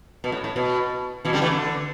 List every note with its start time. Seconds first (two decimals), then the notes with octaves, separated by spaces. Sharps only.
0.24 B2
0.32 A2
0.44 A2
0.56 B2
1.25 B2 E3
1.33 D3 G3
1.42 E3 A3
1.51 D3